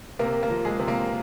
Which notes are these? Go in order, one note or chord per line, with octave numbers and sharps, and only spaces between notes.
C3 A#3 A#4
A#3 A#4
F3
G#3 G#4
C3
A#3 A#4